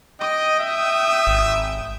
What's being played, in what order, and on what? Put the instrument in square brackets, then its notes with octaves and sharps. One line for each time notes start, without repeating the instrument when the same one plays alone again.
[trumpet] D#5 [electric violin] G5 D#6
[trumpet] E5
[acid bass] G#1